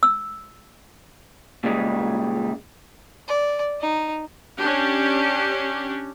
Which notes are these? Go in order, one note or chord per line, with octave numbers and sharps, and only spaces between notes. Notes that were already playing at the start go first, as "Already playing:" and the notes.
E6
A#2 C#3 G3 G#3
D5
D#4
C#4 D4 G4